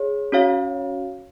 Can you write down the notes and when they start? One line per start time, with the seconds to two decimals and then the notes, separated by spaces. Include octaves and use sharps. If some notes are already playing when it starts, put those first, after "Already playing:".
Already playing: G#4 C#5
0.32 C#4 F#4 C#5 F5